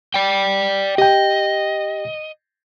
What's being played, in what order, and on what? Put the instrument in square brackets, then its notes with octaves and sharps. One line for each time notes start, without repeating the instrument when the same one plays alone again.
[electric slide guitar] D5 G5
[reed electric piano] G4 G5 [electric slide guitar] D#5